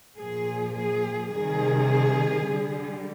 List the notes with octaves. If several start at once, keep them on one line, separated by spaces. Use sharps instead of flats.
A#2 F3 G#4
G#4
C3 D#3 G3 G#4
D3 G3